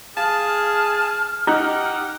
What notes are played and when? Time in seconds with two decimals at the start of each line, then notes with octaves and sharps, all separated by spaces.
0.17 G#4 F5 A5 F6
1.47 D#4 G4 F#5 F#6